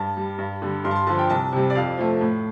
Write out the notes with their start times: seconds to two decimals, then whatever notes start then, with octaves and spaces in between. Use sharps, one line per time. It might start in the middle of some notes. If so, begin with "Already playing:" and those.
Already playing: G2 A5
0.17 G3
0.38 G2
0.62 D3 G3
0.84 G2 C6
0.91 A5
0.95 C6
1.07 D3 F3 A5
1.19 G5
1.30 C2 A5
1.52 C3 G3
1.70 D5
1.75 F2 F5
1.97 F3 A3
2.21 A2